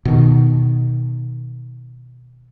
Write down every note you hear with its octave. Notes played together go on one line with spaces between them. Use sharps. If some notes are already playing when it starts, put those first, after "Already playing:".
B2 D#3